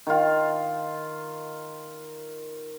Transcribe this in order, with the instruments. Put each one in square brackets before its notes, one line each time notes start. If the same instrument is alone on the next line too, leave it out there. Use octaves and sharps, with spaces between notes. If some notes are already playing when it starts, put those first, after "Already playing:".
[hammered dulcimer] D#3 F4